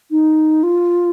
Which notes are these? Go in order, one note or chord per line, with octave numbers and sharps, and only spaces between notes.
D#4
F4